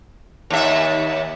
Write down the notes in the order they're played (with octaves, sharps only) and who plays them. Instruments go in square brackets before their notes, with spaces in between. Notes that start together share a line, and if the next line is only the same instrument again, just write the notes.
[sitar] D#2 E5